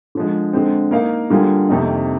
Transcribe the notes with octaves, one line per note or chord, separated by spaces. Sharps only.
D3 F3 G#3
D3 G#3 C4
A#3 D#4 A#4 F5
D3 G3 A#3 F4 G#4
F2 C3 D#3 A#3 D#4